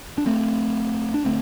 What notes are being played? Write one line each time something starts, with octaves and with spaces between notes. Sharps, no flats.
D4
A3 C4
D4
D3 A3 C4